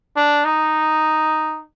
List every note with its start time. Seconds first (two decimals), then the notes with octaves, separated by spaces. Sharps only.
0.16 D4
0.45 D#4